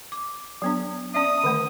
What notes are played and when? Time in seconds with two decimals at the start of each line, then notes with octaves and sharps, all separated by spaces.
0.12 D6
0.62 F#3 B3 D4
1.14 C#4 D5 E5 D#6
1.44 D3 D#3 A3